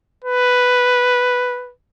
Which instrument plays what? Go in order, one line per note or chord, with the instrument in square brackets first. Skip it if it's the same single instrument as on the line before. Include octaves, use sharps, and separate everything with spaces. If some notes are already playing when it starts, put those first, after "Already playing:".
[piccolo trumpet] B4